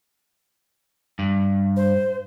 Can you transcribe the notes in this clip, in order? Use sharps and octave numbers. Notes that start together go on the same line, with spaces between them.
G2
C5